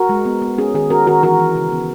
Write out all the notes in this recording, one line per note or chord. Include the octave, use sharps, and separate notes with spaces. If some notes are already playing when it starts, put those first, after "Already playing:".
Already playing: F#4 A#4
G#3
B3
B3
C#4 G#4
D#3 G#4
C#4 F#4 A#4
D#3 F#4 A#4
E3 F#4 A#4
E3
C#3
B3